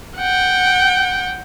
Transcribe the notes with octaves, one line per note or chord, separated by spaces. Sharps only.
F#5 G5